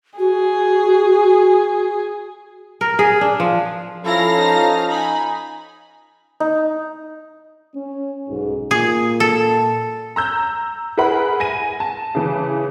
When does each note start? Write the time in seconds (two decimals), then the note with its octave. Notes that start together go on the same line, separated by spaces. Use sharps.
0.18 F#4 G#4
2.81 A#4
2.99 G#4
3.21 D4
3.40 F3
4.05 F3 C#4 E4 A4 F5 A#5 A#6
4.36 D#4
4.89 D#4 G#5 B5
6.40 D#4
7.74 C#4
8.28 B1 G#2
8.71 A#2 G#4
9.20 A4
10.16 A#5 E6 G6
10.97 E4 G#4 A#4 B4 F#5 B5
11.40 G#5 A#6 D#7
11.80 A5
12.15 C#3 E3